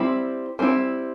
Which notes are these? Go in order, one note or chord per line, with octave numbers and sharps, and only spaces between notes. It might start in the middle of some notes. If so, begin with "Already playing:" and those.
Already playing: G3 C4 E4 B5
G3 C4 E4